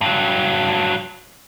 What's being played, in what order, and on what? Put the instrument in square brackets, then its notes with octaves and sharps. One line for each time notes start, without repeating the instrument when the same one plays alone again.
[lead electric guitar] G2 F#3